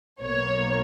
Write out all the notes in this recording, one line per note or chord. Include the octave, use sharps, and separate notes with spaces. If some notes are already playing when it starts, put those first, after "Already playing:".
B1 B2 A#3 C#5